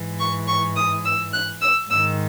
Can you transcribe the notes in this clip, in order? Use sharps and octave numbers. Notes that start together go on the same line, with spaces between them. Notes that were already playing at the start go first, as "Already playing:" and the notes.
Already playing: G#2 E3
C#6
C#6
D#6
E6
F#6
E6
G#2 D#3 E6